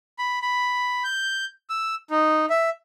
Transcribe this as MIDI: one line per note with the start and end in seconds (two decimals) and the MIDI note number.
0.19 0.39 83
0.42 1.03 83
1.04 1.45 91
1.70 1.95 88
2.11 2.46 63
2.50 2.70 76